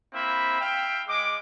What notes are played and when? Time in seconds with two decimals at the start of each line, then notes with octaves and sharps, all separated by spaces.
0.13 A#3 C4 E4 E5 B5
0.61 E5 F5 G5
1.08 G#3 D6